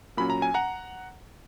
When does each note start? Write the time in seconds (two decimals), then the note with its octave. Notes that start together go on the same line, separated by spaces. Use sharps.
0.17 A#2 F#3 C#4 B5
0.30 A#5
0.42 G#5
0.54 F#5 A#5